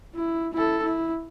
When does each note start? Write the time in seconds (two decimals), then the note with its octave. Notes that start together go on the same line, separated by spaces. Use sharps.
0.15 E4
0.53 E4 A4
0.83 E4